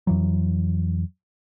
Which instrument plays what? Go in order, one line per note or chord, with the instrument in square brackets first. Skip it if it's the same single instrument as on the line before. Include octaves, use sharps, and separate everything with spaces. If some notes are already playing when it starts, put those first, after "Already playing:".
[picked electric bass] F2 E3 F#3